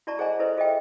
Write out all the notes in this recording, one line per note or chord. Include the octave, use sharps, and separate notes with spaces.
E4 F#4 D5 A5 A#5 C#6
G#4 C5 D#5 F#5 G#5 A#5
E4 A4 B4 C5 D#5
F4 G#4 A4 D#5 E5 G5